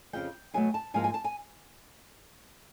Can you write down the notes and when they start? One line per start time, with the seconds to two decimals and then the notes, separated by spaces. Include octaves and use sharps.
0.13 F2 C#3 F3 G5
0.54 B2 F#3 A3 G#5
0.74 A5
0.94 G#2 F3 A#3 G#5
1.04 G#5
1.14 A5
1.24 G#5